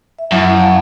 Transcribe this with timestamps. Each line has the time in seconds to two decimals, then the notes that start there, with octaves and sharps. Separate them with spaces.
0.19 E5
0.32 F#2 F#3 E4
0.57 F5 A5